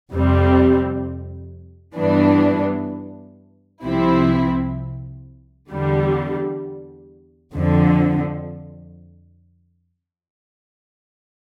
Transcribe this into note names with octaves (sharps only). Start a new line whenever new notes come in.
F2 C3 G3 C4
G2 E3 B3 D4
C2 C3 F3 C4 E4
E2 D3 G3
F2 D3 F3